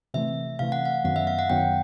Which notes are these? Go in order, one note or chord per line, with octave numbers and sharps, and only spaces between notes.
C3 E3 A3 E5
C3 E3 A3 F5
F#5
F5
F#2 D#3 F#3 B3 F#5
E5
F5
F#5
F#2 D#3 F#3 B3 G5